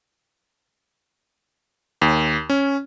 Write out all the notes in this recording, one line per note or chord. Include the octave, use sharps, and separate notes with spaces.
D#2
C#4